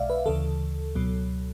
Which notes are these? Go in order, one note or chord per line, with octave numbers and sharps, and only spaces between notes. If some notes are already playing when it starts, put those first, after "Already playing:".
Already playing: B1 B2 G#3 D5 E5 F5
B4
D2 C#3 E3 A4
C#2 B2 F#3